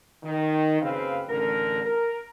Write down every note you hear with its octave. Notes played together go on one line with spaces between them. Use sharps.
D#3
F#1 C#3 C4 B4 F5
A1 D3 A#4
A#4